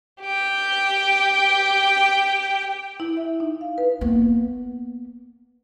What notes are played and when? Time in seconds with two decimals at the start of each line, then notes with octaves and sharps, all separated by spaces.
0.23 G4 G5
3.00 E4
3.17 E5
3.40 D#4
3.61 F5
3.78 B4
4.01 A#3 B3